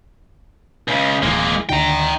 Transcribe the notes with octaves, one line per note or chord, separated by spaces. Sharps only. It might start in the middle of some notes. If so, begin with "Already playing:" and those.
C#2 C#3
D1 E3 G#3 A#3
D2 D3 D#3 G5 A#5